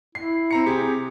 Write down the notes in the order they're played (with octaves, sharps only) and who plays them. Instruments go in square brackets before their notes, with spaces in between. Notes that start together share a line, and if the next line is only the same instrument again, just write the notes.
[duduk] E4 [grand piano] C7
[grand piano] C4 A#5 C#7
[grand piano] C3 G4 [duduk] G#4